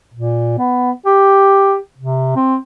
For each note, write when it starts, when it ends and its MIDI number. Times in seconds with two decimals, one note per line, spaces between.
0.14 0.58 46
0.58 0.91 59
1.06 1.77 67
1.98 2.33 48
2.36 2.56 60